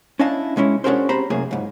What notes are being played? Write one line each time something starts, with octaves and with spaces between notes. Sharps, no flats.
C#4 D4 E4 D#5 F5 A5
B2 G#3 C#4 E4
C#4 D4 F#4 G#4 A#4 C5
C4 G4 C5 A#5 B5
F#2 A2 C3 A#3 G#4
C#2 G#2